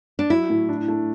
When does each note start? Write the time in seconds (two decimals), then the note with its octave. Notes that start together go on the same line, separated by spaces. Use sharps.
0.19 D4
0.30 F#3 E4
0.50 A2
0.69 D4
0.88 A3